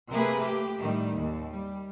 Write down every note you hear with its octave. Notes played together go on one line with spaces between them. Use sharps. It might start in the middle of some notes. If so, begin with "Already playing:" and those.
C3 A3 A#3 G#4 A#4 B4
G4
A2 D#3 G3
D#2
G3